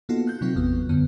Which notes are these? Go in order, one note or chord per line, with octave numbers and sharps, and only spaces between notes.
A#3 B3 D#4 F4 F#4 A4
F#6 G6
C3 F#3 C4 D#4 F4
G#1 E2 B3
F#2 D3 B3